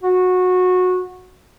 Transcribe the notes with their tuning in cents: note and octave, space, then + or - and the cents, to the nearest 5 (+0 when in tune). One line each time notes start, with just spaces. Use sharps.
F#4 -20